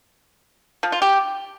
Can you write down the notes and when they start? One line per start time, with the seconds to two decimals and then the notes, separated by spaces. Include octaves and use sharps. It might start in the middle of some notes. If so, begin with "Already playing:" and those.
0.83 F3
0.92 F4
1.02 G4